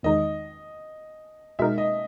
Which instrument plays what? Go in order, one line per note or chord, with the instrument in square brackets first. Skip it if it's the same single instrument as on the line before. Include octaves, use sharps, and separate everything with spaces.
[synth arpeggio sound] E2 D#3 G#3 D#4 [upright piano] D#5
[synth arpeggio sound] B2 G#3 D#4 A#4 [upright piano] E5
[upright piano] D#5